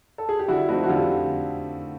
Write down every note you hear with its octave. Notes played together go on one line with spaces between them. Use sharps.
A4
G#4
G4
D3 E4 F#4
F3 A3 C4 D#4 E4 F#4
F#4
D3 F4 G4